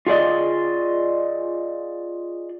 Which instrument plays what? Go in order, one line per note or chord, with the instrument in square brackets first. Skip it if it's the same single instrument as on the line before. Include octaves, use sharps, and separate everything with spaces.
[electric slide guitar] F4 G#4 D5 D#5